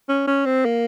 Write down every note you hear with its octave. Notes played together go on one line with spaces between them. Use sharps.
C#4
C#4
C4
A#3